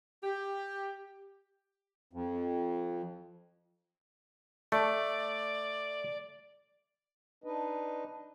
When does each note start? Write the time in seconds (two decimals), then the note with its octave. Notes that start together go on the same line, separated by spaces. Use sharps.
0.24 G4
2.13 F2
4.72 A3 D5
7.44 D4 D#4 B4 D#5